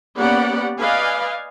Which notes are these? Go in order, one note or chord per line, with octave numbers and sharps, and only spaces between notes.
A#3 B3 C#4 G4 D5 F#5
B4 D5 D#5 F5 G#5